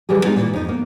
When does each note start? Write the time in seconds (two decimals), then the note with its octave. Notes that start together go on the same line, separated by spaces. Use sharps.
0.09 D3 E3 F#3 G3 G4 G#4
0.25 G#3 B3 D#4 F4 G#4
0.36 A#2 E3
0.53 F2 D#4
0.69 A#3 B3